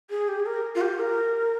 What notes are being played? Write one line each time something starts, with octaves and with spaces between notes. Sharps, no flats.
G#4
G4
G#4
A#4
F4
G4
A#4